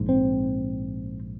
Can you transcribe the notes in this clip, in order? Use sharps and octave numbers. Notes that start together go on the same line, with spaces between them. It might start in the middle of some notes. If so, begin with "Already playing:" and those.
Already playing: A#1 G#2
C4